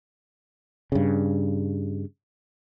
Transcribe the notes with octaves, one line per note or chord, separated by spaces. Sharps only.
G2 C#3